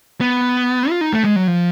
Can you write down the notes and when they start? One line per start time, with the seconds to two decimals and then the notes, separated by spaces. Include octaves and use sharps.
0.21 B3
0.90 F4
1.01 D#4
1.13 A3
1.24 G#3
1.36 F#3
1.47 F3